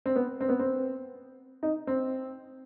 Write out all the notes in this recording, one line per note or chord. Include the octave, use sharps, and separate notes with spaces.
C4
B3
C4
B3
C4
D#4
C4